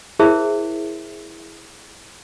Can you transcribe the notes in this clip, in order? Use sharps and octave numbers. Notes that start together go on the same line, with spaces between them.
E4 G#4 A#4 C5 E5